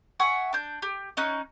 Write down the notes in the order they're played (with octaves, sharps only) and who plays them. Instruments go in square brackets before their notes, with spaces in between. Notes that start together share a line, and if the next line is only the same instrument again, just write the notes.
[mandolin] E5 F#5 G#5 C#6
D4 G6
G4
C#4 D#4 F#6